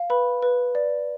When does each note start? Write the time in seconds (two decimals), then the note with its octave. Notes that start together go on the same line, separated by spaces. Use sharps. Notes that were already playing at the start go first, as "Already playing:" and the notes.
Already playing: F5
0.10 B4 B5
0.42 B4
0.75 D5